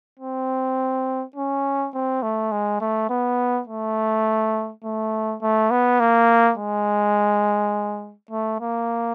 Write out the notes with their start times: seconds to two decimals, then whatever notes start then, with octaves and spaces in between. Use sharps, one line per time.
0.20 C4
1.36 C#4
1.94 C4
2.22 A3
2.52 G#3
2.81 A3
3.09 B3
3.67 A3
4.84 A3
5.42 A3
5.71 B3
6.00 A#3
6.58 G#3
8.31 A3
8.61 A#3